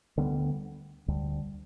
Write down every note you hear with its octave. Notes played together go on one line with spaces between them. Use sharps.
D2 D3 G3 B3
D2 D3 G3